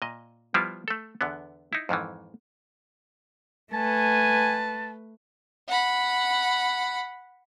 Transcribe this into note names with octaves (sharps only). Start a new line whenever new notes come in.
A#2 D#5
F3 G3 B3 E4 F4
A3 A4
E2 D3 B3
D#4 E4
F2 G#2 D#3 E3
A3 B4 G#5 A5
F#5 B5